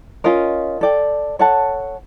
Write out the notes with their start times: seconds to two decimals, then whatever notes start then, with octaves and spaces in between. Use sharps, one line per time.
0.24 C#4 F4 A#4 D#5
0.81 A4 D5 G5
1.39 A4 C#5 F#5 A5